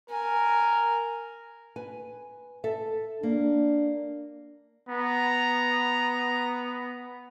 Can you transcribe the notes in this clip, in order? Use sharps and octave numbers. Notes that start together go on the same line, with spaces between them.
A#4 G#5
B4 G#5
A4 E5
A#3 D4
B3 A#5